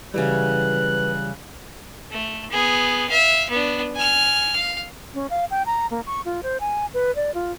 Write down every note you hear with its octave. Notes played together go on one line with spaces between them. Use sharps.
C#3 E3 F#3 G3 E4 B4 F#6
A3
B3 G#4
E5 F5
B3 D4
G#5 F6
F5
C#4
F5
G5
A#5
A#3
C#6
F4
C5
G#5
B4
D5
F4